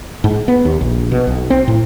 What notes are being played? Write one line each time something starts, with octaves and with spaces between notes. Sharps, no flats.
G#2
B3
D#2
A#1
B2
B1
C4
A2